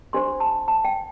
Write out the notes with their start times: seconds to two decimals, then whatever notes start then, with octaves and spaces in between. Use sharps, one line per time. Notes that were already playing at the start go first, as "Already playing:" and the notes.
0.13 D4 G4 C5 C6
0.40 A5
0.68 A5
0.85 G5